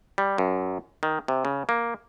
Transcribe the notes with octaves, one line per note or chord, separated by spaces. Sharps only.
G3
F#2
D#3
C3
C#3
A#3